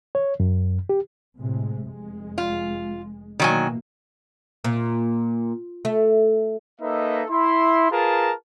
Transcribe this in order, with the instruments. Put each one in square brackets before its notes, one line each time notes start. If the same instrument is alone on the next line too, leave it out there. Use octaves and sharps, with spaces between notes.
[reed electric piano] C#5
F#2
G4
[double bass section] A2 C3 G#3
F1 G#3
[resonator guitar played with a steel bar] F4
[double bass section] B2 E3 A#3 [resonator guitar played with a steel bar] D#3 F#3 G#5
[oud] A#2
A3
[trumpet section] A#3 D#4 A4 B4 D#5 E5
E4 C6
F4 G#4 A#4 B4 A5 A#5